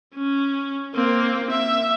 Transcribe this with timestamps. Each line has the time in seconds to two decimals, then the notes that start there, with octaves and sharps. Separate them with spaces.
0.14 C#4
0.95 A#3 C4
1.51 E5